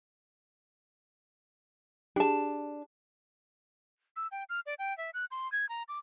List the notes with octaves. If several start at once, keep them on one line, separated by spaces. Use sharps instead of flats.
D4 G4 G#4 A5
E6
G5
F6
D5
G5
E5
F#6
C6
G#6
A#5
D6